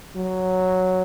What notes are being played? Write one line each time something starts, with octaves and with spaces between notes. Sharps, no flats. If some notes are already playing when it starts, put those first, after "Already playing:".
F#3